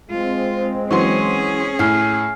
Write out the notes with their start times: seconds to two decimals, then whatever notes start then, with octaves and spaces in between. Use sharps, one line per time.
0.10 G#3 C4 F4
0.91 E3 F#3 C#4 G#4 C6 C#6
1.79 A2 G#5 F6 C7